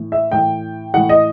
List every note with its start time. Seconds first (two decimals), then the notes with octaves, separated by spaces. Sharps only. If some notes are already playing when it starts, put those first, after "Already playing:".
Already playing: A2 E3
0.12 E5
0.32 A2 E3 G5
0.94 A2 E3 F#5
1.09 D#5